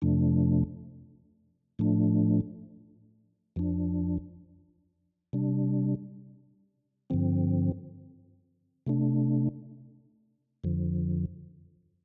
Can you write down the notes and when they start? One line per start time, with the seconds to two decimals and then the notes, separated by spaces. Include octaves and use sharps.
0.02 F2 C3 F3 A3 D4
1.79 A2 F3 A3 D4
3.56 F2 F3 D4
5.33 C3 G3 D4
7.10 G2 D3 F3 C4
8.87 C3 A3 D4
10.64 F2 D3 F3